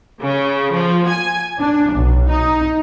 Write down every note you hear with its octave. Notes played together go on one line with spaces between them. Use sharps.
C#3
F3
G#5
D4
B1
D#4